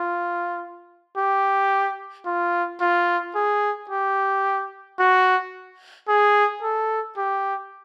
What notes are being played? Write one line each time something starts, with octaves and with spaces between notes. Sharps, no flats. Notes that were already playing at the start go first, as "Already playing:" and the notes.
Already playing: F4
G4
F4
F4
G#4
G4
F#4
G#4
A4
G4